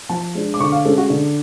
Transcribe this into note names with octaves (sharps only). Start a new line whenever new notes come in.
F3 A5
G#3 D4
D6
D3 C#6
F5
G#3 C#4 A4
F#4
D3